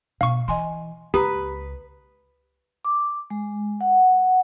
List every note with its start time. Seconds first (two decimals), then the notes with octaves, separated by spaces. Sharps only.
0.21 B2 F5 C#6
0.48 E3 D#5 G#5 C6
1.14 C#2 G4 B4 A#5 D#6
2.85 D6
3.30 G#3
3.81 F#5